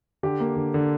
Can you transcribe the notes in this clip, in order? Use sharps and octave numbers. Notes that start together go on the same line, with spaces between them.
D3 G4
A#3
D3
D3